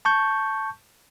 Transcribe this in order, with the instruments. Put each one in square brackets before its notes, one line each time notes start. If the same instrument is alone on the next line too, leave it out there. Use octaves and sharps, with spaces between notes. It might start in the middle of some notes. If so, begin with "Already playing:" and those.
[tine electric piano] A5 C#6 G6